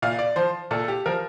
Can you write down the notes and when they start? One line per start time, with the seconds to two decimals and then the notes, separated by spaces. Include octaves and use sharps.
0.02 A#2 F5
0.19 D5
0.36 F3 C5
0.71 A#2 A4
0.88 G4
1.06 F3 A#4